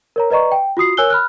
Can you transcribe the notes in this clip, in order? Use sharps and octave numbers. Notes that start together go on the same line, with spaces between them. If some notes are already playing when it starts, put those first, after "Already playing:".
A#4 C#5 A#5
B4 D5 D#5 A#5 C#6
G5
F4 F#4 D#6 C7
A#4 C#5 G#5 E6 F#6 G7
B5 F6 F#6